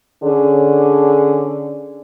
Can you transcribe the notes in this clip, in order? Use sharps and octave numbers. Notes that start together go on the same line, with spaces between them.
D3 C#4 G#4